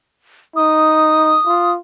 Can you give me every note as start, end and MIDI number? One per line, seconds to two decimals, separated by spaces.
0.56 1.36 63
0.56 1.72 87
1.46 1.77 65